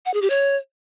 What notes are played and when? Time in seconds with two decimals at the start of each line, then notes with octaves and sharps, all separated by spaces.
0.06 F#5
0.14 G#4
0.22 G4
0.30 C#5